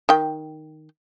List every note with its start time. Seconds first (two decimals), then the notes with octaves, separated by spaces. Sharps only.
0.09 D#3 G5